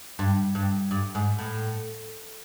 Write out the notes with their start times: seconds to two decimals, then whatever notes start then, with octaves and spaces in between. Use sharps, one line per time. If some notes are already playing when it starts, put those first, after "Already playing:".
0.19 G2
0.55 G2
0.91 G2
1.15 G#2
1.38 A2